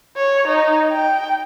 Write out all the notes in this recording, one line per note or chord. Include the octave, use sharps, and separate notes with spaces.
C#5
D#4
G5